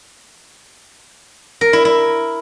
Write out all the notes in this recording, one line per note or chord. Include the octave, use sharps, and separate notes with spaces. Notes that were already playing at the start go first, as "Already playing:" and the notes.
A#4
E4
E4